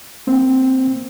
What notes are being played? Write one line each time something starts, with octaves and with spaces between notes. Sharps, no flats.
A#3 C4